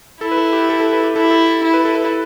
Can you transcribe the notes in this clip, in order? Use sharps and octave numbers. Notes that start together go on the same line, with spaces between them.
E4 A4
B4
A4
G4
A4
A4
B4
G4
E4 A4
G4
A4
E4
B4
A4
B4